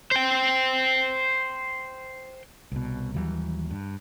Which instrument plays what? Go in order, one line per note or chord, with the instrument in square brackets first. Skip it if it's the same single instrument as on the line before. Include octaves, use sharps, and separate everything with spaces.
[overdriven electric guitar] C5 G5
[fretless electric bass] C2 B2
D#2 E3 F#3 G3
G2